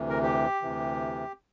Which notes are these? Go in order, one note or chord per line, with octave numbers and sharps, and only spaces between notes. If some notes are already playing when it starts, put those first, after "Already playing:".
Already playing: D2 C3 E3
A#4
G4
D2 C3 E3